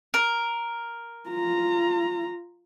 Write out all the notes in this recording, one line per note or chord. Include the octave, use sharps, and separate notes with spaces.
A#4
F4 A#5